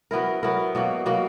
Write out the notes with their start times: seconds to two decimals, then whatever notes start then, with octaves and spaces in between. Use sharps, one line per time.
0.11 F#3 B3 E4 A#4
0.43 F#3 B3 E4 A#4
0.75 B2 F#3 A#3
1.06 B2 F#3 A#3